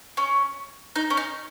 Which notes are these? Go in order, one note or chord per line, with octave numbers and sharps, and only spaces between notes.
C#4
D#4
C#4
D#4